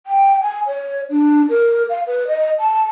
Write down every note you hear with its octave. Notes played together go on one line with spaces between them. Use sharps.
G5
G#5
C#5
D4
A#4
F5
B4
D#5
A5